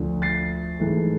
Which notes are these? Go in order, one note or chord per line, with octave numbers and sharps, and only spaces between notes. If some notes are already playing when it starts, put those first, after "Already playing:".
Already playing: D2 D3 F3
A6 C7
G#2 E3 A3